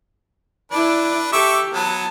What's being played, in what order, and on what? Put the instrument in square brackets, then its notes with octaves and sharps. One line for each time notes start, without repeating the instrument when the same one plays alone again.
[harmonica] D4 B4 [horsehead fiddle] E4 D5
[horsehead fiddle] G4 A4 [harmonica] E5 C#6 D6
[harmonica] F#3 B3 [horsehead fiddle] A5